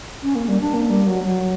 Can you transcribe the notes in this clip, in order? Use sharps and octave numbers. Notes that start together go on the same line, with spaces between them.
C#4
A#3
G3
D4
A#3
G3
F#3
F#3